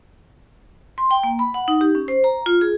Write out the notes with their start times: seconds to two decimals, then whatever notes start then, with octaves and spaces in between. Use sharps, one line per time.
0.98 C6
1.11 G5
1.23 A#3
1.39 B5
1.54 F#5
1.68 D#4
1.81 G4
1.95 C#4
2.08 C5
2.24 A#5
2.46 F4
2.61 G#4